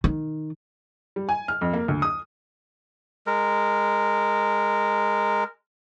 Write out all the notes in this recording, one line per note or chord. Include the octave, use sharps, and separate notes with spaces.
D#3
G3
G#5
F6
F2
A#3
D2
D#6
G#3 A#4